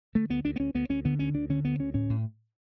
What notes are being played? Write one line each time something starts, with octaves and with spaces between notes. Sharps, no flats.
D3 A3
D2 B3
D2 D4
B3
D2 C#4
D2 B3
D2 C#4
D3 B3
D2 C#4
D2 D4
D3 C#4
D2 B3
D2 C#4
A2 C#4
A2